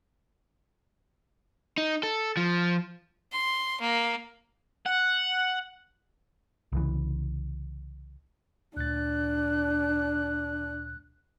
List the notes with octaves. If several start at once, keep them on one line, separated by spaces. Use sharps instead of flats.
D#4
A4
F3
C6
A#3
F#5
C2 C#3 E3
D2 A#2 D4 F#6 A6